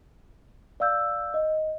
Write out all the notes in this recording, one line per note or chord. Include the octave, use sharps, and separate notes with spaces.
D5 F5 E6 G6
D#5